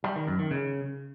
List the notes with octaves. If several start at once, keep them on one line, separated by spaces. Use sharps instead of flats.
G3
D#3
F#2
D#3
C#3